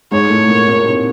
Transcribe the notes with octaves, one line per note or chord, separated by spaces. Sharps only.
G#2 G#3 C#5
A2 A3
A#2 A#3
A#2 A#3
C3 C4